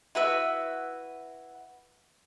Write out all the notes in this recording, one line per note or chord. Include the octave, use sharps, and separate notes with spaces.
E4 F#4 B4 E5